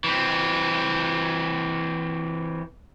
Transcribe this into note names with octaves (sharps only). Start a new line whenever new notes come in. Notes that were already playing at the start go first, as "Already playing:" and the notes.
E3 C4